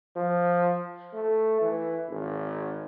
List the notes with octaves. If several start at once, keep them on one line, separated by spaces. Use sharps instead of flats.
F3
A3
E3
G#1